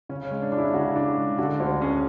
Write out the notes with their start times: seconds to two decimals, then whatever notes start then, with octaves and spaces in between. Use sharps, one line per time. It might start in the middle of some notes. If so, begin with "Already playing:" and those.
0.09 C#3 C#4
0.25 C#4
0.31 G#3
0.42 D4
0.52 D4
0.58 E4
0.73 C#3 F#4
0.96 D4
1.16 G#3
1.38 D3 F#4
1.60 D2 F#4
1.81 C#4 G#4